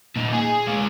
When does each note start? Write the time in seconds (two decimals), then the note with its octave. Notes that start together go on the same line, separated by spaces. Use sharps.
0.16 A#2 D#4
0.33 G#4
0.67 G#3 F5